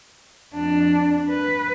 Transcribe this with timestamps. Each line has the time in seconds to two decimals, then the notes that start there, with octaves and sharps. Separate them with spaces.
0.54 F2 D4
1.29 B4